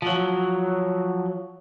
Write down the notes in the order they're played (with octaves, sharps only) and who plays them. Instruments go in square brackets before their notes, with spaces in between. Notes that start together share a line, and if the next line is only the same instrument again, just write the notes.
[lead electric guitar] F3 F#3